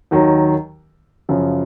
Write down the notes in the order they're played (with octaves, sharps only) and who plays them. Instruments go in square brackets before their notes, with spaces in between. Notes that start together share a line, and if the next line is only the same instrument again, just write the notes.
[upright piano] D#2 D#3 F#3
F#2 C#3 F3